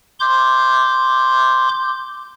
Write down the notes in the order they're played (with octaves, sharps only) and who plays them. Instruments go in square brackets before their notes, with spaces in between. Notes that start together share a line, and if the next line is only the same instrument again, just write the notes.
[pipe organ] C6 D6 G6